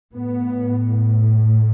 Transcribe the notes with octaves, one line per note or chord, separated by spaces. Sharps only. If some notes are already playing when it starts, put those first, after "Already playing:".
A2 B3